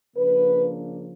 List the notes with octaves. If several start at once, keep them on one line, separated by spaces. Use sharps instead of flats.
C#3 F3 A#3 D4 B4